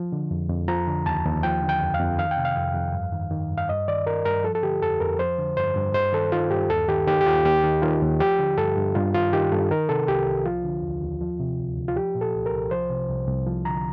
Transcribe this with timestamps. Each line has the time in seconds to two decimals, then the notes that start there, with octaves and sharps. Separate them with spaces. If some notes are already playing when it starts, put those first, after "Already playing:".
Already playing: F3
0.12 D3
0.31 F2
0.50 F2
0.68 F3 A#5
0.87 D3
1.06 D#2 A5
1.25 D#2
1.43 F3 G5
1.62 D3
1.69 G5
1.81 F2
1.94 F5
2.00 F2
2.19 D#3 F5
2.31 G5
2.37 C3
2.45 F5
2.57 F2
2.75 F2
2.94 G2
3.13 D#3
3.31 D#3
3.50 G2
3.58 F5
3.69 G2 D#5
3.88 D#3 D5
4.06 D#3 A#4
4.25 G2 A#4
4.44 F3 A4
4.55 A4
4.63 D3 G4
4.82 F2 A4
5.00 F2 A#4
5.19 F3 C5
5.38 D3
5.57 G2 C5
5.76 G2
5.94 G2 C5
6.13 D#3 A4
6.32 D#3 F4
6.50 G2 G4
6.70 D#2 A4
6.89 D#3 G4
7.07 D#3 G4
7.21 G4
7.26 D#2 F4
7.45 D#2 G4
7.64 D#3
7.82 D#3 F4
8.02 D#2
8.20 F3 G4
8.39 D3
8.57 G2 A4
8.77 G2
8.95 G2 F4
9.14 D#3 F4
9.33 D#3 G4
9.52 G2 A4
9.71 D#3 A#4
9.89 C3 A4
10.08 C2 G4
10.27 C2
10.46 F3 F4
10.64 D3
10.83 D#2
11.03 D#2
11.21 F3
11.40 C3
11.59 D2
11.77 D2
11.88 F4
11.96 F3 G4
12.15 A#2
12.21 A4
12.35 C2
12.46 A#4
12.53 C2
12.71 F3 C5
12.90 C3
13.09 C2
13.28 C2
13.47 F3
13.65 D3 A#5